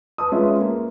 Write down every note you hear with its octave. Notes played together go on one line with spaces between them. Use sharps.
B4 A5 D#6
G#3 C#4 F4 B4 E5
A#3